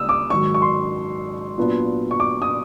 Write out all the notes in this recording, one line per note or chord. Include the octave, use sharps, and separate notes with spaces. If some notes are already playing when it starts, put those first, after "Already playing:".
Already playing: C#2 G3 A#3 D#6 E6
D6
G#2 D#3 F#3 C#6
C#6
C6
A#2 F#3 B3 D4 F4
C#6
D6
D#6